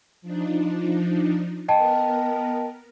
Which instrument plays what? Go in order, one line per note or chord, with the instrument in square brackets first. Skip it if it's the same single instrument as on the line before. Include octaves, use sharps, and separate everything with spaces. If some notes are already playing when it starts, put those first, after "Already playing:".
[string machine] F3 D4 D#4
[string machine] B3 A#4 [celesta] D#5 G5 A5